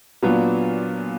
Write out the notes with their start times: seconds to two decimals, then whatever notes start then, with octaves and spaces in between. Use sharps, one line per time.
0.23 A#2 F#3 B3 D4 F4